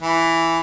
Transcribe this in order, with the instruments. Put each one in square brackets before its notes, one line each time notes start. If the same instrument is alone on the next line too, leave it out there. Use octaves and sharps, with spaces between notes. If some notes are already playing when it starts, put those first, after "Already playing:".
[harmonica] E3